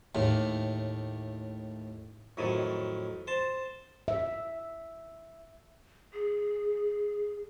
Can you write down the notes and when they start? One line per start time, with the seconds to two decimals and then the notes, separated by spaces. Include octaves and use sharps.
0.15 D#2 A2
2.37 F2 A2 D#3 F#3
3.27 C5 A5
4.08 E5
6.13 G#4